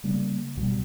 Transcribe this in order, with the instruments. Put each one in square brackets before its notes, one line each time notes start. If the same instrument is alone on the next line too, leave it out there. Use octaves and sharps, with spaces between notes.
[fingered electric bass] C#3 G3 A#3
C#2 B2 F#3 G3